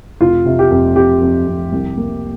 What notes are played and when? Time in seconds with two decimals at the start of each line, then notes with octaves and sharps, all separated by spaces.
0.21 F1 F4
0.45 C3
0.59 G4
0.71 F2
0.96 C3 G4
1.21 F2
1.47 F2
1.72 C2
1.97 A#3